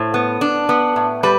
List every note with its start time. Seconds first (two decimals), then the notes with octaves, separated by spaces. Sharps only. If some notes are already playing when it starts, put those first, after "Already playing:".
Already playing: A2 C5
0.14 B3
0.41 D4
0.69 B3
0.96 A2
1.23 G3 B4